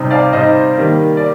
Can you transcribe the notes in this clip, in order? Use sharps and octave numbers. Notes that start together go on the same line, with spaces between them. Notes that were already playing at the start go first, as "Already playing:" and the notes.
Already playing: C3 G3 C4 D#4
D5 F5
C3 G3 C4 D#4 C5 D#5
D#3 G3 A#3
D5